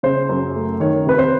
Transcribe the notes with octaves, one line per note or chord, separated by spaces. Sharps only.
C#3 C5
F#2
A3
D#3 C#5
C3 B4
C5